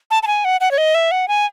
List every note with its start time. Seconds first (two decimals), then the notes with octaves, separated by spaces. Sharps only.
0.11 A5
0.23 A5
0.27 G#5
0.45 F#5
0.61 F#5
0.71 C#5
0.78 D#5
0.95 E5
1.11 F#5
1.28 G#5